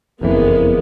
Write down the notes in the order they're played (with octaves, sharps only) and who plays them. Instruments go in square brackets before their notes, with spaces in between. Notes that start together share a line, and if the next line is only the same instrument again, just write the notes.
[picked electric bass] F#1 F2 E3 [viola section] G#3 A#3 B3